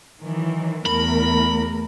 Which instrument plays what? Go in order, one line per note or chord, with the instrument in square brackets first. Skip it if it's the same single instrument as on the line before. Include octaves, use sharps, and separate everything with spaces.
[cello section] D#3 E3 F#3
[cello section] E2 A3 A#4 [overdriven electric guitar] B5